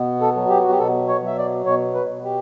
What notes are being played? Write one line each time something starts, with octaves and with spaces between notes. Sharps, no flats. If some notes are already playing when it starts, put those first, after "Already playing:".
Already playing: B2 B3
A4
F#3
G4
F#4
G4
B2 A4
C#5
F#3 E5
D5
B2 C#5
B4
B2
G4